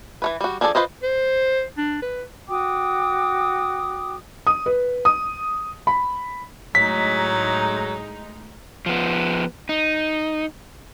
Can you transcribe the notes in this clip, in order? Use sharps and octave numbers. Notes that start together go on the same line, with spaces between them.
E3 A3 B4
G3 F#4
F3 D4 G#4 A4 D5
F4 B4 C5 D#5
C5
D4
B4
F#4 G5 D6 D#6
D#6
B4
D#6
B5
A2 F#3 G#3 D#4 B6
F3 B3
D#4